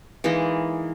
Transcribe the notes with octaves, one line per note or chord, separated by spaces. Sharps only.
E3 G#3 A#3 D#4